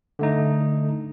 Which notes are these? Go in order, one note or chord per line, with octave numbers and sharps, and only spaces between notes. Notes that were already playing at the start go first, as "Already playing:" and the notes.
D3 A3 D#4